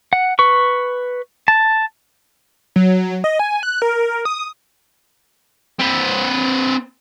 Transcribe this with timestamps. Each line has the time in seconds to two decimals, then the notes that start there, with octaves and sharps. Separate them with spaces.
0.13 F#5
0.39 B4 C#6
1.48 A5
2.76 F#3
3.24 D#5
3.39 G#5
3.63 F#6
3.82 A#4
4.25 D#6
5.79 C4 B4